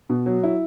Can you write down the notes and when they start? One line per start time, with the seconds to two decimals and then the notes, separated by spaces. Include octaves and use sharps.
0.09 B2
0.26 F#3
0.44 E4